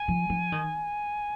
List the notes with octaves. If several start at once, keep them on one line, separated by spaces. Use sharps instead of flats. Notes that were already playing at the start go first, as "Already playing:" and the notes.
Already playing: G#5
F3
F3
D#3